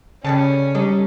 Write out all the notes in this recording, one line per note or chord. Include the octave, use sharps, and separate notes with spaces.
C#3 G3 C#4 A4 A5
G3 D4 D#4 A4